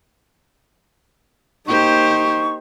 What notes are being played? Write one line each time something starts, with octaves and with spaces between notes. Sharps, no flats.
A#3 D#4 G4 C5 C#6